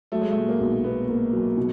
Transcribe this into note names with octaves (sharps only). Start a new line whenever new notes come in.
F#3 A3
G#3
A3
A#2
A#3
B1
A#3 B3
A#3
F#3
B2